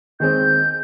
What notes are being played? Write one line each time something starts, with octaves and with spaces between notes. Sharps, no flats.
D#3 G#3 C4 G6